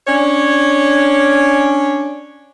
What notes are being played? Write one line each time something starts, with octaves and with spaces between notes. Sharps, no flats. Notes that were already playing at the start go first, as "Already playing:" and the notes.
C#4 D4 C#5